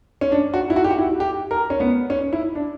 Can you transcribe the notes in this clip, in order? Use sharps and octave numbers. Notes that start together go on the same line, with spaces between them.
C#4
D4
F#4
E4
F#4
G4
F#4
E4
G4
A#4
C#4
B3
C#4
E4
D4